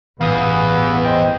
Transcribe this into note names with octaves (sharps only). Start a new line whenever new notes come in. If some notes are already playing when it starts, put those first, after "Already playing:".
A1 E2 G2 A#2 B3 F5 D#6
C5 D#5 G5